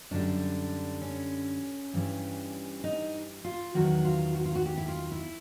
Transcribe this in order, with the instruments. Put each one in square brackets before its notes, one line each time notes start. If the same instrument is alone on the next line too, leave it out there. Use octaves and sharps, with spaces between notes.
[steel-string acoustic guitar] F#2 D3 G3 D4
C#4
G2 E3 G3
D#4
F4
E2 C3 D#3 F#3 F#4
F4
F#4
F4
F#4
G4
E4
F4
E4